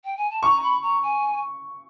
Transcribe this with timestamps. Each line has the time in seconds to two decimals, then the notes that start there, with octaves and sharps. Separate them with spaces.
0.04 G5
0.16 G#5
0.30 A5
0.43 A#5 C#6
0.62 B5
0.82 A#5
1.02 G#5